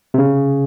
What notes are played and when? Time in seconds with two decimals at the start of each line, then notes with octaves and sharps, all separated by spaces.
0.14 C3
0.18 C#3